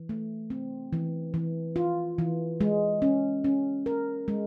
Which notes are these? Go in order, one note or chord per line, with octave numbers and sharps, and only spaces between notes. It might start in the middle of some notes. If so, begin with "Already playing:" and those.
Already playing: E3
A3
C4
E3
E3
F4
E3
G#3
C#4
C#4
A#4
G#3